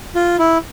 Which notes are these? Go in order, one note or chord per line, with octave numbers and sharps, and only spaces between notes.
F4
E4